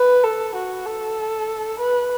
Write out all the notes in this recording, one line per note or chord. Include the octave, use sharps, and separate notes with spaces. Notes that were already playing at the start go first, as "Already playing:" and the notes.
Already playing: B4
A4
F#4
A4
B4